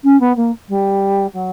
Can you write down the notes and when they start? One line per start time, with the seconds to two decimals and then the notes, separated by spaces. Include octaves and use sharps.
0.04 C#4
0.20 B3
0.36 A#3
0.68 G3
1.33 F#3